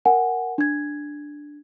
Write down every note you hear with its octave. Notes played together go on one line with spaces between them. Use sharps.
A#4 F#5 G#5
D4 G#6